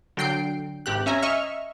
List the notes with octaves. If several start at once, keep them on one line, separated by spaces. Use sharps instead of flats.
D3 F#3 G5 C7 D7
G#1 G4 F#6
C#4 E5 G#5 A#5
D#5 E5 C#6 F6